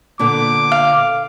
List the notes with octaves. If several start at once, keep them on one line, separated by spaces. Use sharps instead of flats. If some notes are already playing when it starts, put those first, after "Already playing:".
A#2 D3 B3 D6
F5